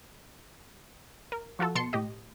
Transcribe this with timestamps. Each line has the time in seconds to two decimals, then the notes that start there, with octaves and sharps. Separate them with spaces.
1.32 A#4
1.59 F3 F4 F#4 A4
1.75 B2 A5 C6 C#7
1.93 A2 G4 D#5